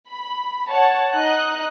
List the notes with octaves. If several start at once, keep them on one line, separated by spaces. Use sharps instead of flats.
B5
C#5 F#5 A5
D#4 D#5 F#6